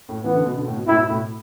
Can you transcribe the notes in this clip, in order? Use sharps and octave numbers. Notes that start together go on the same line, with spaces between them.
A2
E3 B3
D3
B2
D3
A2
B2
A2 E4
B2
A2